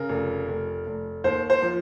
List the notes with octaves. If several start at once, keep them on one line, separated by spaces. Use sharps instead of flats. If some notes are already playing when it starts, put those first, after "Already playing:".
Already playing: C#3 A#4
F1
F1
F1
D#2 C5
C5
F3